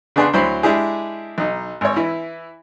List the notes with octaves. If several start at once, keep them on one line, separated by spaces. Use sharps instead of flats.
C#3 B3 D4 G#4 F#5 C6
D2 F#3 E4 C5 B5 C6
G#3 D4 E4 G4 G#4
B1 D#4
G#1 C#5
E3 E4